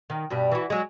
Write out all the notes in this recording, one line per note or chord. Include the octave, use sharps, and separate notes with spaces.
D#3
G2 B2 G3
E3 F#4
F#3 G#3